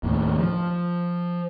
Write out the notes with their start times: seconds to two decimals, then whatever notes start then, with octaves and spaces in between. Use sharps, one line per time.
0.03 D#2 A2
0.39 F3